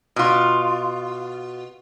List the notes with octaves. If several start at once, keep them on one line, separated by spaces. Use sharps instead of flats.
B2 F4